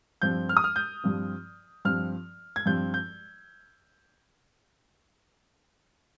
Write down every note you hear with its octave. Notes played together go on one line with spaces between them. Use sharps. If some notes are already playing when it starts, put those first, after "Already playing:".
G2 F3 C4 G6
F6
D#6
F6
G6
G2 F3 C4
G2 F3 C4 F6
G#6
G2 F3 C4 G6
G6